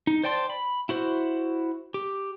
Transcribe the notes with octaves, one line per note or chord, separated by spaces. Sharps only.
D#4
C5 D5 G5 A5 C6
B5
E4 F#4 C5
G4